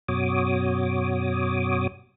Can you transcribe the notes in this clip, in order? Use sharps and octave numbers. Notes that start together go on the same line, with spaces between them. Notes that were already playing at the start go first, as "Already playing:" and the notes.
F#2 B2 F#4 C#5 D6 D#6